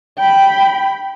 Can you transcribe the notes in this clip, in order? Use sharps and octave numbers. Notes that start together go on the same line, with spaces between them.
G5 B5